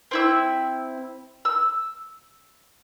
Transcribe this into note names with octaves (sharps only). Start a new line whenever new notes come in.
C4 E4 E6
E6